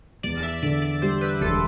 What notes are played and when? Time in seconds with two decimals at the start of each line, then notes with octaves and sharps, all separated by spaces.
0.23 E2 D5
0.43 E5
0.63 D3 D5
0.82 D5
1.02 G3 C5
1.21 B4
1.41 E1 A4